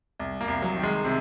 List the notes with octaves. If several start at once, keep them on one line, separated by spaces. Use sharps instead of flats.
C2
A#3
C2
F#3
D#3
G#3
C3